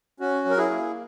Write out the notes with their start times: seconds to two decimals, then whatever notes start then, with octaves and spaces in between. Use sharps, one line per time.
0.20 C#4 F#4
0.45 F#3
0.50 A#4
0.57 E4 G#4
0.70 A#3